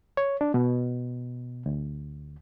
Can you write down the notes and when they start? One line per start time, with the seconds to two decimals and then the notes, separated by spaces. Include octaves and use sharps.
0.17 C#5
0.41 D4
0.54 B2
1.66 D2